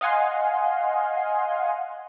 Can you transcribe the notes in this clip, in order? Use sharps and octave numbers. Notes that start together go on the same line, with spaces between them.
D#5 F5 F#5 G#5 C6